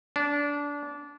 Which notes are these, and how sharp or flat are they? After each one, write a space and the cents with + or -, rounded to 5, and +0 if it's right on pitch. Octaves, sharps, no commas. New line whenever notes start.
D4 -20